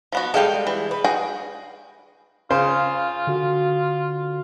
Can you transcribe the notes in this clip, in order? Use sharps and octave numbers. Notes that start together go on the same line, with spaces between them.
F3 B3 F#4
G3 G#3 A4 F5 G5
E3
B4
F#4 G#4 G5
C#3 F4 C5
D3 F#4 F5